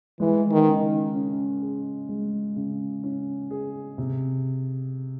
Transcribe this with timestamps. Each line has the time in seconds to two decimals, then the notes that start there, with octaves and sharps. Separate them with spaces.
0.20 E3 G#3
0.51 D#3
0.67 C#3
1.14 C#4
1.62 G#4
2.09 G#3
2.56 C#3
3.04 C#4
3.51 G#4
3.98 C3